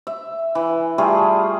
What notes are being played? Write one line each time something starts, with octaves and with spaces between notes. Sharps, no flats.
E5
E3
G3 A3 F4 G#4